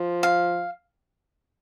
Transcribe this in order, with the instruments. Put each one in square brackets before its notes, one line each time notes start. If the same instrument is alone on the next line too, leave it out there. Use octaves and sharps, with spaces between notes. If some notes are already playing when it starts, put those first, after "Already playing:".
Already playing: [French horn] F3
[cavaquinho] F5